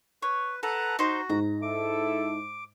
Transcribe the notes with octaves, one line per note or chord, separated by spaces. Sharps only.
B4 C#5
A4 B4 F#5 A#5
D#4 F#4 C5
G#2 A#5
E4 A4 E5 D6